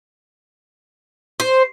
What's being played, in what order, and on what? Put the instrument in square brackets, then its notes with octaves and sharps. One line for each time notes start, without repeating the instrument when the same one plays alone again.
[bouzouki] C5